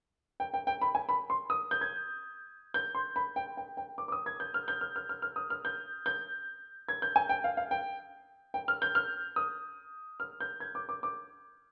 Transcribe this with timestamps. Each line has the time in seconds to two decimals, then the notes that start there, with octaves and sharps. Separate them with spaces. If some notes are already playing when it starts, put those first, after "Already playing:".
0.40 G5
0.54 G5
0.67 G5
0.81 B5
0.95 G#5
1.09 B5
1.30 C6
1.50 D#6
1.71 G6
1.81 G#6
2.74 G6
2.95 C6
3.16 B5
3.36 G5
3.57 G5
3.77 G5
3.98 D6
4.08 D6
4.12 D#6
4.26 G#6
4.40 G6
4.54 F6
4.68 G6
4.81 F6
4.96 F6
5.09 F6
5.22 F6
5.36 D#6
5.50 F6
5.65 G6
6.06 G6
6.89 G#6
7.02 G6
7.16 G#5
7.29 G5
7.44 F5
7.57 F5
7.71 G5
8.54 G5
8.68 F6
8.82 G6
8.95 F6
9.36 D#6
10.20 F6
10.40 G6
10.60 G#6
10.75 D6
10.89 D6
11.03 D6